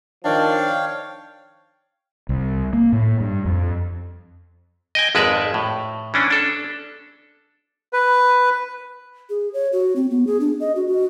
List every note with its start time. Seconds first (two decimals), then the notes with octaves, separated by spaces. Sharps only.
0.25 D#3 F3 D4 C#5 F5 G5
2.29 C2
2.73 A#3
2.92 A2
3.20 G2
3.45 F2
4.95 D#5 G5 G#5
5.15 G#1 F2 G#3 B4 D5 E5
5.54 A2
6.14 E3 C#4 D4
6.30 D4 A4
7.93 B4
9.30 G#4
9.53 C#5
9.73 F#4
9.96 C4
10.11 B3
10.27 G#4
10.40 D4
10.60 D#5
10.76 F#4
10.87 F#4